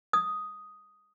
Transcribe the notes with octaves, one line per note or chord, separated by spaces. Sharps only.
D#6